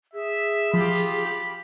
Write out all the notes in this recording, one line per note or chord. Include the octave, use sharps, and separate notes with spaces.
G#4 E5
F3 F4 G4 B5